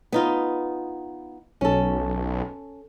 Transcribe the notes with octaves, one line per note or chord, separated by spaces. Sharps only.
B3 D#4 F4
B1 C#4 A4